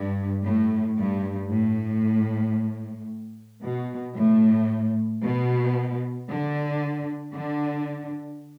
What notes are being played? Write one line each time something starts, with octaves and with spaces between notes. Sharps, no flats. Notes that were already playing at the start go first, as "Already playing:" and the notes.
Already playing: G2
A2
G2
A2
B2
A2
B2
D3
D3